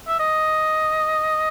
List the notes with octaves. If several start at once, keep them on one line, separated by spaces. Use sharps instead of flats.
E5
D#5